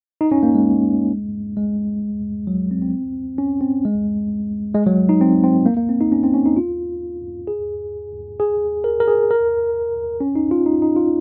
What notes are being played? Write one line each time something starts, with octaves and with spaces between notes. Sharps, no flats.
D#4
C#4
A#3
G#3
G#3
F#3
C4
C4
C#4
C4
G#3
G#3
F#3
D#4
C4
C4
A#3
A#3
C4
D#4
C#4
C4
C#4
D#4
F4
G#4
G#4
A#4
A#4
G#4
A#4
C#4
D#4
F4
D#4
D#4
F4